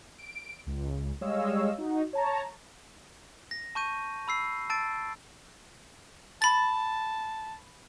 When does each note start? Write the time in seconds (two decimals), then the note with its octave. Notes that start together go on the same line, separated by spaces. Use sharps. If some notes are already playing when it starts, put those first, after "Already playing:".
0.19 D7
0.67 C#2
1.21 G3 G#3 C#5 D#5 F5 E6
1.78 D#4 F#4
2.13 C#5 A5 A#5
3.51 A#6
3.75 A5 C#6 G6 D#7
4.28 B5 E6 C7
4.70 A5 E6 A6 D7
6.42 A5 B5 A6